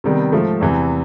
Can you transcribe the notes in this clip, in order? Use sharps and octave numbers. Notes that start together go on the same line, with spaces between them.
C3 D#3 G3 B3
G#2 F3 A3
E2 C3 E3